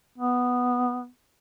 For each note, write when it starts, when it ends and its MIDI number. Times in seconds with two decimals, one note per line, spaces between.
0.18 1.07 59